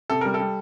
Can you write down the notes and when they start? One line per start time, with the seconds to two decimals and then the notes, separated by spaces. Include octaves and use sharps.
0.10 C3 A4
0.21 G3 A#4
0.34 A4
0.40 G3